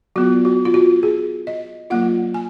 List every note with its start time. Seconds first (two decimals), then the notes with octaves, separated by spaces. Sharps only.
0.16 F#3 B3 F4 F#4
0.45 F#4
0.65 F4
0.74 F#4
1.03 G#4
1.47 D#5
1.90 F#3 A#3 F4 F#5
2.34 G#5